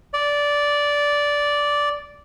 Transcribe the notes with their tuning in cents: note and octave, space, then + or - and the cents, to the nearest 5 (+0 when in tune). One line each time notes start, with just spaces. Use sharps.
D5 -10